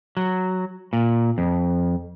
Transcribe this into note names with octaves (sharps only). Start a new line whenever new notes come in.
F#3
A#2
F2